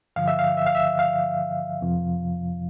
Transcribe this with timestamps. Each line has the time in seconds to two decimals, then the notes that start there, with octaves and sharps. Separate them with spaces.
0.16 G2 D3 F3 F5
0.28 E5
0.39 F5
0.57 E5
0.66 F5
0.75 E5
0.99 F5
1.81 F2 C3 F3